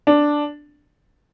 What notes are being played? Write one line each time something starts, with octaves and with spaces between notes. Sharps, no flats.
D4